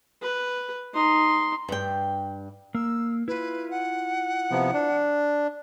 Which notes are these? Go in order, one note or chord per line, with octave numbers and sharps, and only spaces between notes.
B4
D#4 C6
G2 G5
A#3 E6
E4 F4 B4
F#5
C3 F3 B3
D4